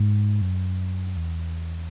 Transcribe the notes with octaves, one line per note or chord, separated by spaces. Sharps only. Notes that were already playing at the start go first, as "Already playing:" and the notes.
Already playing: G#2
F#2
E2